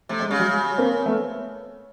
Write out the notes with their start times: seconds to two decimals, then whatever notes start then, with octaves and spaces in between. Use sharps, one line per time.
0.09 C3 A3
0.20 G#3
0.29 C#3 G3
0.39 F#3 G#3
0.78 A#3 C4
1.06 A3 B3